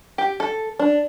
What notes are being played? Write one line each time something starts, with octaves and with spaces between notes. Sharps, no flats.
G4
A4
D4